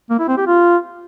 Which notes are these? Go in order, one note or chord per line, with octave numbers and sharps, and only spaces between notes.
A#3
E4
C4
G4
F4